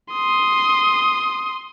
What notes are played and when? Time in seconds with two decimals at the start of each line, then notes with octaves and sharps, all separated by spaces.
0.13 C6 D#6